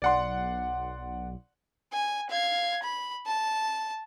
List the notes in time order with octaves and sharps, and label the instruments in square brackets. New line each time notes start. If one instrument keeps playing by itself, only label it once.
[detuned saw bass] B1 [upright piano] D5 F#5 C6
[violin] G#5
F5 G#6
B5
A5